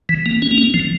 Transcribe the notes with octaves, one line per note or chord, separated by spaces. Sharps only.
E3
A#3
C#4
A#3
C#4
F3